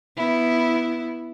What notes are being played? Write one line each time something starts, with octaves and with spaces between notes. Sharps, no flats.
B3 E4